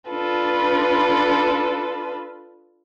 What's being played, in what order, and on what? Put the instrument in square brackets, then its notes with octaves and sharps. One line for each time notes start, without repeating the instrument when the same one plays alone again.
[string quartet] D4 F4 A4 B4